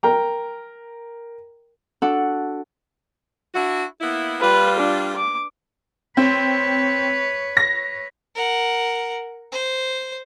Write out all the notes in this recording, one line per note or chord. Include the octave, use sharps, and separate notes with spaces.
A#4 G5 A#5
D4 F#4 A4 F#5
D4 E4 F#4
A#3 B3 E4
G3 F4 B4
D4
D6
C4 B4 C#5
A#6
A#4 F#5
C5